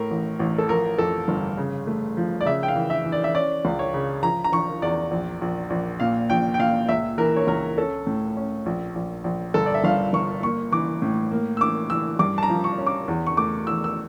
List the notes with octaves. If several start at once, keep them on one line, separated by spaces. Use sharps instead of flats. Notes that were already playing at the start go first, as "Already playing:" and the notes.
Already playing: A2 A3 A#4
A1
A1
A4
F3 A#4
F2 A4
G1
C#3
A3
F3
D5
C#3 E5
G5
F5
E3
E5
E3
D5
E5
C#4 D5
C#2
C#5
C#3
F3 A#5
A#5
F3 C#6
E2 D5
A#1
A#1
A#1
A#2 F5
A#1 G5
G5
A#2 F5
C#2 E5
E3 A#4
C#5
C#2 A#4
C#4 A4
A2
C#4
A#1
A#1
A#1
G1 A4
D5
E5
G1 F5
G1 C#6
A#3 C#6
E3 D6
A2
A#3
E6
E3 D6
E3 E6
G2 D6
A5
A#5
F3
C#6
C#4
D6
E2
C#6
A3 D6
E2 E6
E6